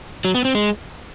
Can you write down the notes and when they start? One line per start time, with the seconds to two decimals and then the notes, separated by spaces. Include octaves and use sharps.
0.25 F#3
0.35 B3
0.45 C4
0.55 G#3